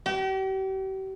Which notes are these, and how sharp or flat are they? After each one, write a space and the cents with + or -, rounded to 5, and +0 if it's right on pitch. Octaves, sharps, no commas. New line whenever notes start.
G4 -40